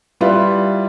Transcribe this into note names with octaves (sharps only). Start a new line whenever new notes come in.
G3 E4 F4 B4